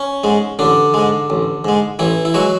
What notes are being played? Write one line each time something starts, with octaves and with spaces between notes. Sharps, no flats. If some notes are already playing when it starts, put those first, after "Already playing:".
Already playing: C#4
G#2 G#3
A1 D3 D4
G#2 G#3
A1
G#2 G#3
A1 E3 E4
E4
F#3 G#3 F#4